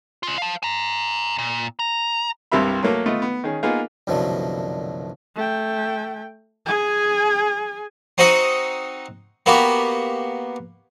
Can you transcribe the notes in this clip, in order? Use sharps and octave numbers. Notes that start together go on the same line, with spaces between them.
C#4 F4
F5 A5
G#5 A#5
A#2
A#5
C2 G2 C3 A#4 E5 B5
F#3 A3 A#3 A4
A3 B3 F4 D#5
B3
D#3 C#4 G#4
A#3 B3 D#4 F4 G#4 A#4
C2 F#2 B2 D3 F3 A3
A3 G5
G#4 G#5
C4 D#4 F#4 D#5 F#5
A#3 B3 F#4 G4